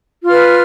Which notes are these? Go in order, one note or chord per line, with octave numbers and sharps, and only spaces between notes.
F4 B4 F6